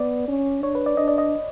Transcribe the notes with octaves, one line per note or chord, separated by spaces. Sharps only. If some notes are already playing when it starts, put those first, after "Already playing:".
Already playing: B3 D5
C#4
D4 C#5
B4
D5
D4 D#5
D5
D#5